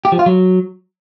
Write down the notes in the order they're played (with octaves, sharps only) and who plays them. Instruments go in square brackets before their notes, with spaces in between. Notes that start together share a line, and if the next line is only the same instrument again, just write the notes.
[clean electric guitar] G4
F3
F4
F#3